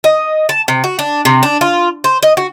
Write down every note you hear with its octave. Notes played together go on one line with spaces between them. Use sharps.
D#5
A5
C3
F#4
D4
C3
D4
F4
C5
D#5
F#4